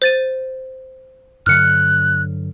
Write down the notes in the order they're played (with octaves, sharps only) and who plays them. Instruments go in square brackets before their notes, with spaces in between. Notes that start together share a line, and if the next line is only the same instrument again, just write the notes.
[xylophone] C5 A6 D#7
[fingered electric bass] G2 D3 F#3 [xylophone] F6 C#7 [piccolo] F#6